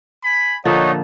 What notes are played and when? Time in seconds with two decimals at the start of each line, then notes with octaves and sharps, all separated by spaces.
0.24 G#5 B5
0.65 A#2 D3 F3 A3 D#4 C#5 D#5 F#5